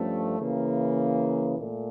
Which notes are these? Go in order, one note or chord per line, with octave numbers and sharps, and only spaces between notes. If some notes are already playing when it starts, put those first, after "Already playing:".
Already playing: G2 F3 A3 C#4
C#3 E3 A#3
A#2 A3